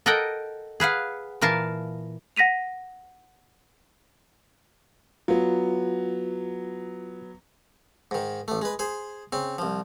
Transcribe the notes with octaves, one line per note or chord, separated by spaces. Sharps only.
A4 A#4 D#5 F#5 G5
G#4 B4 F5 F#5
A#2 E3 A#4 F5 A5
F#5 A#6 B6 D#7 F7
F#3 B3 F4
G#2 D#3
A1 A3
G#3 B4
G#4 C5
C#3 C4
C2 F3